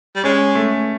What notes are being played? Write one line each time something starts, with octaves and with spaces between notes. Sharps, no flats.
G3
G#3 C#4
A3